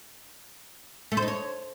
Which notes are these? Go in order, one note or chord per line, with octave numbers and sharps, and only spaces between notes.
A3
C5
D#4
C#5